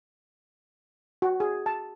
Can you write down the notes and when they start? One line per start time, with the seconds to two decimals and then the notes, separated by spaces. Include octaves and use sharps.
1.22 F#4
1.40 G#4
1.66 A5